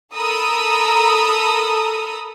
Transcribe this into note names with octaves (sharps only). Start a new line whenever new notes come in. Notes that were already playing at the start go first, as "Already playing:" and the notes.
A4 A#4 A#5 B5 D#6 E6